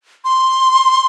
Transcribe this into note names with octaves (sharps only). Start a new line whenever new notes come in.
C6